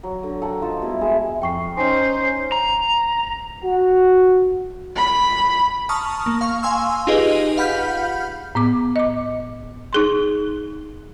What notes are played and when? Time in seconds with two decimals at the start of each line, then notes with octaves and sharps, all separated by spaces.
0.03 F#3
0.23 D3
0.42 A4 A#4 F#5 G5
0.62 F4 C5 D#5
0.82 B2 G3 E4
1.01 G#3 G#4 E5
1.42 F2 G5 C#6 C7
1.77 C#4 D#4 C5 G#5 C6
2.52 A#5
3.63 F#4
4.96 B5
5.89 A5 A#5 C#6 D#6 F6
6.26 A#3
6.41 F5 C#6
6.63 F5 G#5 C6 E6
7.07 D#4 F4 G4 G#4 B4 D#5
7.57 F5 F#5 B5 F6 G6 B6
8.55 A2 B3 D6
8.96 D#5 D6
9.93 D#4 G#4 C6